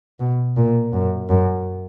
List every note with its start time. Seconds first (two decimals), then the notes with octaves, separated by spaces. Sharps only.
0.20 B2
0.57 A#2
0.93 F#2
1.29 F#2